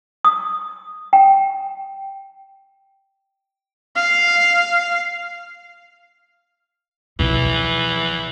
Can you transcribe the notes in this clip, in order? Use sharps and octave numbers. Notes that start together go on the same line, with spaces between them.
D#6
G5
F5
B1 E3 F3